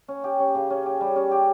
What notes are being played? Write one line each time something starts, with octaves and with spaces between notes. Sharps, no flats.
C#4
G4
C#4
C#3
C#4
G4
G3
C#4
G4